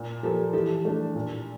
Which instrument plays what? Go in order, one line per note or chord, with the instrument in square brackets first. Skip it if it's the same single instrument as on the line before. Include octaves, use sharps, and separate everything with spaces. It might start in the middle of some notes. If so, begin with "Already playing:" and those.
Already playing: [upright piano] A#2
[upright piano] F3 A#3 [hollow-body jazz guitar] G4 A4
[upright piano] E3 [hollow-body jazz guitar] G4 A4
[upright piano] A3 D4
A#2